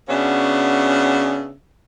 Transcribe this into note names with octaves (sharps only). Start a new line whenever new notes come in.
C#3 B3 C#4 D4 F#4 E5